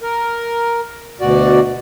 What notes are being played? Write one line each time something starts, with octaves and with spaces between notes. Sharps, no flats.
A#4
D2 B2 F#4 D5